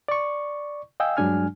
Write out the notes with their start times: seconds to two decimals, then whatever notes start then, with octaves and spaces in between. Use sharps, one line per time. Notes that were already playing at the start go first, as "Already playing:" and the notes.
0.08 D5 C#6
1.00 D#5 F5 G5 G#5 E6
1.17 G2 F#3 G#3 D4 G#5 F6